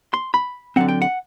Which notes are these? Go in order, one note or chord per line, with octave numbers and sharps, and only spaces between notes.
C6
B5
D3 F#3 C4 F#5
G5
F#5